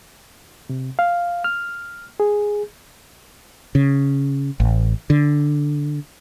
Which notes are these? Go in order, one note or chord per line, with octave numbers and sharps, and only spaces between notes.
C3
F5
F6
G#4
C#3
A1
D3